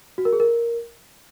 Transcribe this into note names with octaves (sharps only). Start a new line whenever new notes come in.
F#4
A#4
G#4
A#4